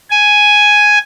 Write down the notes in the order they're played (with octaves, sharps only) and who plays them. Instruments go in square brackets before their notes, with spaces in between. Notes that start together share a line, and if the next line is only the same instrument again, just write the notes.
[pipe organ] G#5